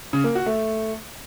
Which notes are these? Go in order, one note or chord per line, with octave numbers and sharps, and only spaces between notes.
C#3
A#3
F#4
A3